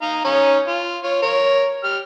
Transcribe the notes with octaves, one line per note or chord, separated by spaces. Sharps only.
D#4 F5 A#5
C#4 D#4 C#5
F4
F4 C#5
A#4 C#5
G4 F6